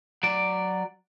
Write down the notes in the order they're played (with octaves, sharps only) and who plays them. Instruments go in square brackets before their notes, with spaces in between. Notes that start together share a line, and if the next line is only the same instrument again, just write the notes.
[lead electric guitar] F#3 D5